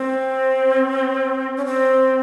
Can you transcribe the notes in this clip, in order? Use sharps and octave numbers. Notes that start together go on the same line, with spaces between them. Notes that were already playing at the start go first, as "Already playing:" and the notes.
Already playing: C4
C#4
C4